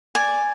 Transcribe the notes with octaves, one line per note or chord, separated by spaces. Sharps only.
D5 G#5